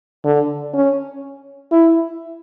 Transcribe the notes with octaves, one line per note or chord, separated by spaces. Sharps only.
D3
C#4
E4